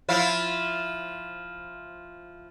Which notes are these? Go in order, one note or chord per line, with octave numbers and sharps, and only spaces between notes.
F3 E4 F4